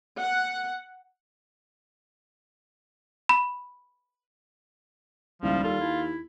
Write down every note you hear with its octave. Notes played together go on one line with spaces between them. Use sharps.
F#5
B5
D#1 C#2 F3 G3 E4 F5
D#2 F4 A4
E4